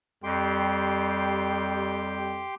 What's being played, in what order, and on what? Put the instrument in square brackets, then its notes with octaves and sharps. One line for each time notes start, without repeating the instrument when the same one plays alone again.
[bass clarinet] F2 [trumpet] G3 [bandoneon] G4 G5 C6